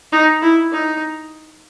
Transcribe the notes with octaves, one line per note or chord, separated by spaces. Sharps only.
D#4
E4
D#4